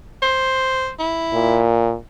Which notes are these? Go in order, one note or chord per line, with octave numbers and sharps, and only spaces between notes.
C5
E4
A#2